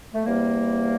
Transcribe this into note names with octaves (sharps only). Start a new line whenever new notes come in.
A3
E2 C3 G3 A#3